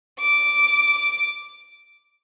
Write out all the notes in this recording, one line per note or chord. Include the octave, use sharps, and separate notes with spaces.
D6